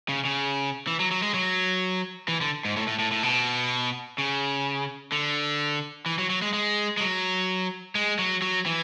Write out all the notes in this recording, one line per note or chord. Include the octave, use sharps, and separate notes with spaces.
C#3
C#3
E3
F#3
F#3
G#3
F#3
E3
D3
G#2
A2
A2
A2
A2
B2
C#3
D3
E3
F#3
F#3
G#3
G#3
G#3
F#3
G#3
F#3
F#3
E3